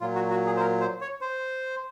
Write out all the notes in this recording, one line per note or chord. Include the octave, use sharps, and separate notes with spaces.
A#2 F#3 F4
F#4
F#4
G#4
C5
A#4
C5
C#5
C5